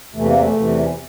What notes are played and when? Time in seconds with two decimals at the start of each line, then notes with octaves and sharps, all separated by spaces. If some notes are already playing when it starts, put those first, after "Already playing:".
0.14 E2 C3 E3 A3
0.26 A#3
0.39 A3
0.54 E2 C3 E3